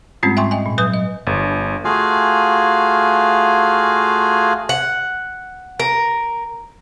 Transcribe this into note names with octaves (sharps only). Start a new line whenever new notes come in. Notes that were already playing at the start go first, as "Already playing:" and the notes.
G#2 G3 G#3 C4 C#4 F4
E5 G5 G#5 C6 C#6
D#5 G5 G#5
A#2
F#3 B4 G#5 D#6 G6
D#5
G1
A3 F4 F#4 G#4 F5 G#5
F#5
A#4